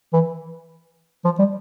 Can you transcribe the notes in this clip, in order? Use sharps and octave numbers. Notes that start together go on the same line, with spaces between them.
E3
F3
G3